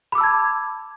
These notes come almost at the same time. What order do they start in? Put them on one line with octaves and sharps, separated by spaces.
B5 D6 E6 A5 G#6